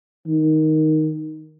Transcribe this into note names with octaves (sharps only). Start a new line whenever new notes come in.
D#3